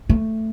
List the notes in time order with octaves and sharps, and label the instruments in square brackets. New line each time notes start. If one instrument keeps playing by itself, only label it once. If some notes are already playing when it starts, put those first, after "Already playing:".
[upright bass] A3